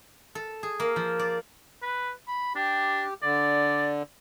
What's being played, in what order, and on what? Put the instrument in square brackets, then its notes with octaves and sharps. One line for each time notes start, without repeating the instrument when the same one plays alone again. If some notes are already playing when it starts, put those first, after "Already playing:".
[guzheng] A4
G#4
A#3
F3
D5
[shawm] B4
B5
[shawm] D4 [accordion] G4
[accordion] D3 [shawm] D5